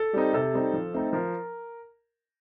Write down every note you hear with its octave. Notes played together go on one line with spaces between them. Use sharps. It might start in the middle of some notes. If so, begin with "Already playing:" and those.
Already playing: A4
G3 C4 D#4
C3 A4
G3 C4 D#4
F3
A3 C4 D#4
F3 A#4